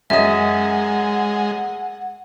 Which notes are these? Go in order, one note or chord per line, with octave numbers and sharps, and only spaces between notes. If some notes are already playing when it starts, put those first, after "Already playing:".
F#2 G#3 D#5 E5 F#5